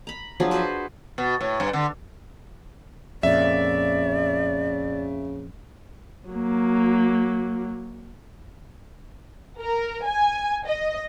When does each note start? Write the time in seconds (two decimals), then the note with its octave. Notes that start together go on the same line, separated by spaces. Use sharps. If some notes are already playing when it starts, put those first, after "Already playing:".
0.07 A#5 B5
0.40 F3 F#3 D4 G#4
0.51 F#4 G#4 B4 C5
1.18 B2
1.41 A2
1.60 G2
1.73 D3
3.23 F2 A#2 C#3 D5 E5
6.30 F#3 A#3
9.59 A#4
10.05 G#5
10.66 D#5